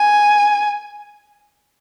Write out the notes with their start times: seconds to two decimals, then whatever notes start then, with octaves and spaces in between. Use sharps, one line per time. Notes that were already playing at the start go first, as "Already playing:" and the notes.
Already playing: G#5